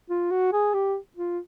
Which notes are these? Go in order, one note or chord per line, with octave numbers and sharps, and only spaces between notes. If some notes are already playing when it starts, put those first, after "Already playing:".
F4
F#4
G#4
G4
F4